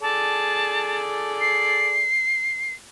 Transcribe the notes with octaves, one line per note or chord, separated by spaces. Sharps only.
G#4 A4 D5 A5
C7